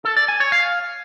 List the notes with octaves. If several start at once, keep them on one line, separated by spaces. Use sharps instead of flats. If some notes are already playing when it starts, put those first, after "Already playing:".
A4
D5
G#5
C#5
F5